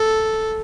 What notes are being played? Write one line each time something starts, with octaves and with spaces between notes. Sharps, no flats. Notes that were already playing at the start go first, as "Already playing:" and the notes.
Already playing: A4